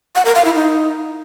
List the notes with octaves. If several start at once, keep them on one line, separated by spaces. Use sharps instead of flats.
F#5
A#4
F5
E4
D#4